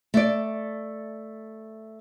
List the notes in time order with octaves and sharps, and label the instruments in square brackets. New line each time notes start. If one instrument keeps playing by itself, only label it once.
[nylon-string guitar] A3 D5